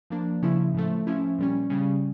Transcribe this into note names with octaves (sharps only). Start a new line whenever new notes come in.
F3 A#3 D4
C#3 F3 C#4 E4
A2 F3 A3
F3 C#4 E4
A#2 G3 C#4
C#3 G3 C#4